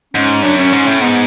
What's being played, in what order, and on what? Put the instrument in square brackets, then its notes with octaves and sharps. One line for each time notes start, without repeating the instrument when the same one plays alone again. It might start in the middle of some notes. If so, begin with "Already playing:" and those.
[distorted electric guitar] G#2 [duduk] C#4
[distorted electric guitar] F#2 [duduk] D4
[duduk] C#4
[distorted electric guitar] G#2
A2
[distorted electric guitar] G#2 [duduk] B3